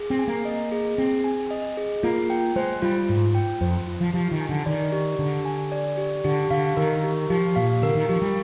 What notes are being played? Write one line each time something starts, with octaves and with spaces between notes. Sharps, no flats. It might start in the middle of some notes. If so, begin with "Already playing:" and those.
Already playing: G#4
C4
G#5
A#3
D#5
G#4
C4 G#4
G#5
D#5
G#4
A#3 F4
G5
G#3 C5
G3 F4
G#2 F4
G5
F2 C5
F4
F3
F3 G4
D#3
G#5
D3
D#3 D5
G4
D3 G4
G#5
D5
G4
D3 G4
D3 F5
D#3 A#4
G4
F3 G4
A#2 F5
D3 A#4
D#3
F3 G4
G3